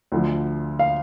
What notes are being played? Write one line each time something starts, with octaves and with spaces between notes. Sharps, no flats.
D2 D3 F3
F5